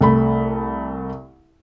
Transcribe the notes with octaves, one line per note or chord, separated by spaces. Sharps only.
C2 A3 B5